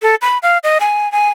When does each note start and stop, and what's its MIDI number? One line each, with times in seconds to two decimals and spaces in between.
0.02 0.15 69
0.22 0.38 83
0.43 0.58 77
0.64 0.78 75
0.80 1.11 80
1.12 1.29 80